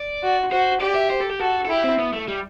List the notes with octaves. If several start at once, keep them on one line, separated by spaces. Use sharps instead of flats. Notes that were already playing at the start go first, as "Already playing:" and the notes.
Already playing: D5
F#4
F#4 C5
G4 D5
E5
C5
A4
G4
F#4 A4
A4
E4 G4
C4
B3
A3
G3